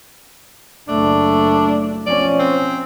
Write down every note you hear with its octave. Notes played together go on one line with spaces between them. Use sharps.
F#1 A3 D4
F3 C#4 D5
C4